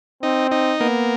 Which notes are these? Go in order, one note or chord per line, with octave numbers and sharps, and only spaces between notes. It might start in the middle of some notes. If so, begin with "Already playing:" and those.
C4 D#4
D#4
A#3 B3